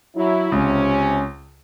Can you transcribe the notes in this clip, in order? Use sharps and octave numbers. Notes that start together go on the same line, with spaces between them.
F#3 E4
C#2 C3 C#4